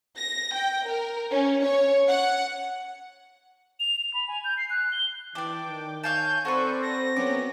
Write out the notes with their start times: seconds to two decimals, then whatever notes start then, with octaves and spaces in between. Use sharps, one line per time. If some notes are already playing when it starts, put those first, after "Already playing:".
0.17 A#6
0.55 G5
0.85 A#4
1.31 C#4
1.64 C#5
2.08 F#5
3.80 F7
4.00 F7
4.14 B5
4.28 G#5
4.45 G6
4.57 C7
4.70 F#6
4.92 G7
5.35 E3 D4 D5 G5 D6
5.68 D#3
6.04 C#5 F5 G#5 A5 G6
6.45 C4 F#4 A4 B4 C5 D5 C#6
6.82 A#6
7.16 F#3 B3 C#4 D6